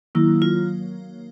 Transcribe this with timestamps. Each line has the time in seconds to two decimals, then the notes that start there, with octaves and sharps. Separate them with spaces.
0.15 D#3 F#3 A#3 E4
0.42 F4